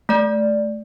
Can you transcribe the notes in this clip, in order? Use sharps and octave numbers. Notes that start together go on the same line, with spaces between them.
A3 D5